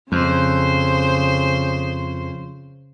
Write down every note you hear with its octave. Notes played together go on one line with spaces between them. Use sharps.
F2 C#3 C5